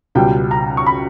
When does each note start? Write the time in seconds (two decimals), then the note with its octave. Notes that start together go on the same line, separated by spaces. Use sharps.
0.15 C#2 B2 G3 G5
0.51 A#5
0.77 C#6
0.86 B5